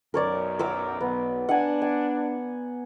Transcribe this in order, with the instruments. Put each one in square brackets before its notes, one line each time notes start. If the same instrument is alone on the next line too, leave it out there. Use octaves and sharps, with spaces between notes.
[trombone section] B1 F#2 [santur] A#4 C#5 D5
[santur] A#4 D6 E6
[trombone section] B1 [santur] B3
[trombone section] D4 [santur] F#5 G#5
[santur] G#5